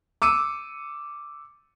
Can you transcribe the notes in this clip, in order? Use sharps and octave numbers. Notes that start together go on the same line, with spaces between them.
D6 E6 C#7 D#7